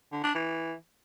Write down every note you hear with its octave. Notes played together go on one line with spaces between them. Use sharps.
D3
D4
E3